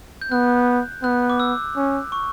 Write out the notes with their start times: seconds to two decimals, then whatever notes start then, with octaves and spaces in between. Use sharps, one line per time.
0.22 G6
0.31 B3 F#6
1.03 B3 F#6
1.30 D6
1.40 E6
1.76 C#4
2.12 C#6